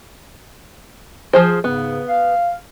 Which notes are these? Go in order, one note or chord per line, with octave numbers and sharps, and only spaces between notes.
F3 G#4 C5
G#2 C#3 B3
F5